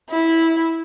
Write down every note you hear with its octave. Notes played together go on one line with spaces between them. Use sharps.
E4